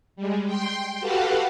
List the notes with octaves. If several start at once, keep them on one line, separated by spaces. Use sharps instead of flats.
G3 G#3
G5 C6
F#4 G4 A4 B4 F5 F#5